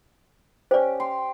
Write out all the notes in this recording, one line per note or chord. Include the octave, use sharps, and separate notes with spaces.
C#4 G4 C5 D5
F5 G5 C6